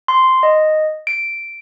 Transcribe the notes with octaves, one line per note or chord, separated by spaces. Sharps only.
C6
D#5
D7